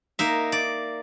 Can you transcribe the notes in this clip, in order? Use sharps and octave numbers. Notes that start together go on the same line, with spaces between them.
A#3 D#4 E5
D5